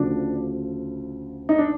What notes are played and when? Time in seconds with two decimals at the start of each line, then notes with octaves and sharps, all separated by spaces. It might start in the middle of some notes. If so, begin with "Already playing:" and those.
Already playing: D2 C#3 F3 D4
1.49 D#4
1.58 D4